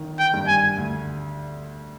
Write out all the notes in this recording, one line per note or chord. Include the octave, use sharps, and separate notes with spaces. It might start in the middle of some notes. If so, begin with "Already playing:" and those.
Already playing: G1 D#3
G5
G2
G#5
D2